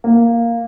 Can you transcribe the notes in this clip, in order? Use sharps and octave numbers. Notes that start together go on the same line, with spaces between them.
A#3